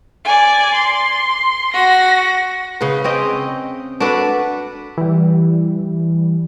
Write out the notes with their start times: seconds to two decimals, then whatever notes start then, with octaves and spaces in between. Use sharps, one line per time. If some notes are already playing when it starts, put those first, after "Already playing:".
0.24 D5 G#5
0.74 C6
1.73 F#4 A#6
2.81 C#3 B4
3.04 C4 C#4 D#5 G5
4.00 D4 F#4 A4 B4
4.98 E3 G3